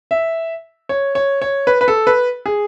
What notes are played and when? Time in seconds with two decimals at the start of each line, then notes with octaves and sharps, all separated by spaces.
0.11 E5
0.89 C#5
1.15 C#5
1.42 C#5
1.67 B4
1.81 B4
1.88 A4
2.07 B4
2.46 G#4